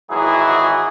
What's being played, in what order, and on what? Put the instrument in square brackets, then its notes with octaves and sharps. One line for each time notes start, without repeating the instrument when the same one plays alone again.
[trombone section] G#1 E3 F#3 E4 G#4